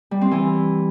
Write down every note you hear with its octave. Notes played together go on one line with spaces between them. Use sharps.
G3
C4
E3